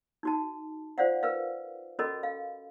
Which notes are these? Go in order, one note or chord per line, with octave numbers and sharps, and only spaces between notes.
D#4 F#4 A5
F4 C5 D5 F5 F#5
A#4 B4 F5
C#4 F#4 A4 A#4 D#5 B5
F5